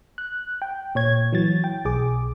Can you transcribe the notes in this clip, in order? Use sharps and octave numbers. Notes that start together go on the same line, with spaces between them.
F#6
G5
A#2 C#5 G#6
E3 F#3 A6
G5
B1 G#4 D6